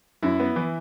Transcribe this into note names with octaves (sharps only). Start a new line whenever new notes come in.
F#2 E4
B3
E3